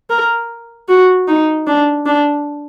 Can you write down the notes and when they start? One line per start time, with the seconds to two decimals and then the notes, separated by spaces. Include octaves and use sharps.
0.10 A#4
0.89 F#4
1.28 D#4
1.67 D4
2.06 D4